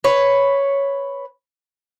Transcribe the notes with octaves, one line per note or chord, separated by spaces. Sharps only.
B4 C#5